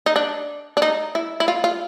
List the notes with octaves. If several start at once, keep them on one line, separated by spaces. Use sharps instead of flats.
D#4
D4
D4
D#4
E4
E4
F4
F4